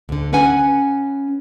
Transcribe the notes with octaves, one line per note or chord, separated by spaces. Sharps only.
D2 D3
C#4 B4 F#5 G#5